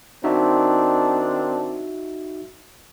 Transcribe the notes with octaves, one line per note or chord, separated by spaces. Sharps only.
D#3 C4 D4 D#4 F#4 E5